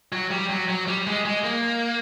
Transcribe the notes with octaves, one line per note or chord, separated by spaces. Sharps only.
F#3
G3
F#3
F#3
G3
G#3
G#3
A#3